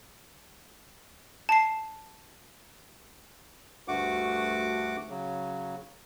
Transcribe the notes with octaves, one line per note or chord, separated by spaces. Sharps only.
A5 C7
D2 G2 A3 F#4 F#5 D6
C#3 F#3